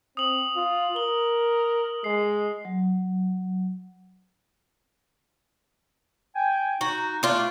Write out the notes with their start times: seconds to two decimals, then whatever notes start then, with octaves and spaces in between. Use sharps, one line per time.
0.17 C4 D#6 F#7
0.56 F4
0.96 A#4 G7
2.04 G#3 C7
2.65 F#3
6.35 G5 G#5
6.81 D#4 F#4
7.23 A3 D4 F4